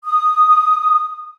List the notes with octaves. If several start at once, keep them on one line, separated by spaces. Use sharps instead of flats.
D#6